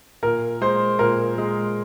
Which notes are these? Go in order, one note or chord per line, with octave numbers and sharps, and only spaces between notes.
A#2 A#4
G#3 C5
A#2 A#4
G#3